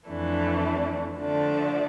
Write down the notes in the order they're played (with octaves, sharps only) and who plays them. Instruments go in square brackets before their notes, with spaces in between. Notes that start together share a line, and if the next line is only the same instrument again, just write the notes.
[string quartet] F2 E3 A3 D4
D3 F3 A3 D4